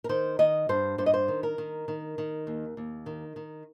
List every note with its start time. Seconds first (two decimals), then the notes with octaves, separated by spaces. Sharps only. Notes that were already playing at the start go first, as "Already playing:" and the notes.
0.04 A#4
0.09 D#3 C5
0.39 D#3 D#5
0.69 G2 C5
0.98 G2 C5
1.06 D#5
1.14 C5
1.28 D#3
1.43 A#4
1.58 D#3
1.88 D#3
2.18 D#3
2.47 D#2
2.77 D#2
3.06 D#3
3.36 D#3